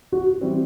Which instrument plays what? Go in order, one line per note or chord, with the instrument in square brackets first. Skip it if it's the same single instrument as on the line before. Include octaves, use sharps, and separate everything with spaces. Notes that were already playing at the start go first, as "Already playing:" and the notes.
[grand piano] F#4
[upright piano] E3 G3 C4